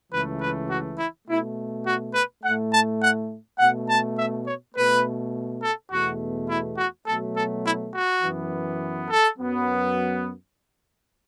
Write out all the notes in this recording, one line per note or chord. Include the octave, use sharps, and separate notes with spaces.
C#2 C#3 E3 A3 B4
B4
F#4
E4
B2 A3 E4
F#4
B4
A2 A3 F#5
A5
F#5
B2 A3 F#5
A5
E5
C#5
B2 A3 B4
A4
E2 B2 A3 F#4
E4
F#4
B2 F#3 A3 A4
A4
E4
F#4
F#2 E3 B3
A4
F#2 F#3 B3